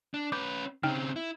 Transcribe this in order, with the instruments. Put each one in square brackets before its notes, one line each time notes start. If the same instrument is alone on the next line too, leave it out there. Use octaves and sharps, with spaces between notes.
[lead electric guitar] D4
[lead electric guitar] C#4 B4 [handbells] D6 G6
[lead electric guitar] C#3 C4 [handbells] D#4 G5 F6
[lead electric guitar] E4